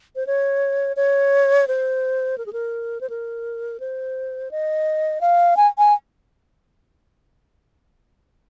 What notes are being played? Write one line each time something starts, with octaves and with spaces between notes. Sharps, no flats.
C5
C#5
C#5
C5
A#4
G#4
A#4
C5
A#4
C5
D#5
F5
G#5
G#5